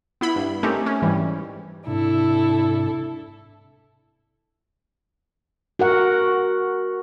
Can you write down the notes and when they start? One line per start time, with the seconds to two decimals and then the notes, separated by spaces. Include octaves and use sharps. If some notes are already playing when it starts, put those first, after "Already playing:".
0.21 B3 E4 B5
0.36 G2
0.63 A3 C4 C#4 D#4 G4 A#4
0.86 C#4
1.02 G#2 E3 G3
1.87 G#2 C3 D4 E4 A4
5.79 F#4 A#4 F#5